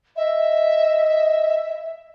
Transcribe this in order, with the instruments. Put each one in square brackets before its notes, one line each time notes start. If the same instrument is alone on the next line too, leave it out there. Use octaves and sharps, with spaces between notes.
[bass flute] D#5 [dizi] E5